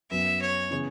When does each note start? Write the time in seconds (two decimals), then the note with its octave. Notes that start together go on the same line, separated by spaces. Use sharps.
0.11 F#2 F#3 B3 E5
0.42 C#5
0.71 C#3 E3 B3 G#4 B4